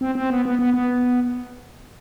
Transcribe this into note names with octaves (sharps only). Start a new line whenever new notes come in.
C4
C4
B3
B3
B3
B3